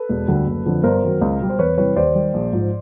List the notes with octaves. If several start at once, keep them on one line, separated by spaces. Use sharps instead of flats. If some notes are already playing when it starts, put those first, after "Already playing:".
Already playing: A4 B4
E1
D2 D3 G3
F#1
F2 D3 F3
G1 A#4 C5
F#2 D#3 F#3
C#2
B2 G3
C5
E2 B4 C#5
C3 E3 G3 B4 C#5
D#2 C5 D5
D#3 G3
A#1
G#2 F3